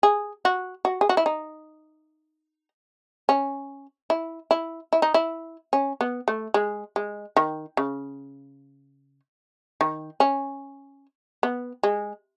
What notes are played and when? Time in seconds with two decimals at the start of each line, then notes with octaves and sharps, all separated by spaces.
0.03 G#4
0.45 F#4
0.85 F#4
1.01 G#4
1.09 F#4
1.17 E4
1.26 D#4
3.29 C#4
4.10 E4
4.51 E4
4.93 E4
5.02 D#4
5.14 E4
5.73 C#4
6.01 B3
6.28 A3
6.54 G#3
6.96 G#3
7.36 D#3
7.77 C#3
9.81 D#3
10.20 C#4
11.43 B3
11.83 G#3